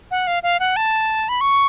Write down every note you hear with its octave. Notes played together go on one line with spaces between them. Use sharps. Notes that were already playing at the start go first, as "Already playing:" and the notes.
F#5
F5
F5
F#5
A5
B5
C#6